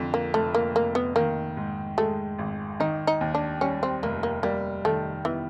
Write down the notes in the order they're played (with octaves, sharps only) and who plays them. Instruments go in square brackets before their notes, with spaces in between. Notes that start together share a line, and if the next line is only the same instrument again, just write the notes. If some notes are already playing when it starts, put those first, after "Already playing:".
Already playing: [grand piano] F2 D3
[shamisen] A#3
[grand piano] F1 [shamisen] A3
[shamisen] A#3
[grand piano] F1 [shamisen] A#3
[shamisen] B3
[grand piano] D#3 [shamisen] A#3
[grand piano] G#2
[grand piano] G#3 [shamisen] A3
[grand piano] G#1
[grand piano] D#3 [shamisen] D#4
[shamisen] D#4
[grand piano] D#2
[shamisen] D4
[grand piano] G3 [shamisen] C#4
[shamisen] C4
[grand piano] F1 [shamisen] A#3
[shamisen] A#3
[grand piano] G3 [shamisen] A#3
[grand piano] D#3 [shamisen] A3
[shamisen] E3 [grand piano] B3